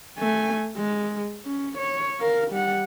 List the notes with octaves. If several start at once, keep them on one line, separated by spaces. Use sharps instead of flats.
A3 G#5
G#3
C#4
C#5
A#4 F5
G3 F#5